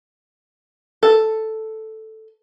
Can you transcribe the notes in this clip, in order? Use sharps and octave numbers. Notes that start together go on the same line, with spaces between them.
A4